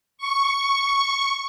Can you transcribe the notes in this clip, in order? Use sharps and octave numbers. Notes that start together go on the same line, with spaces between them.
C#6